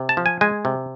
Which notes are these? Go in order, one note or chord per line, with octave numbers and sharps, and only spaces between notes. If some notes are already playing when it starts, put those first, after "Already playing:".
Already playing: C3
A5
F3
G#5
G#3 G#5
C3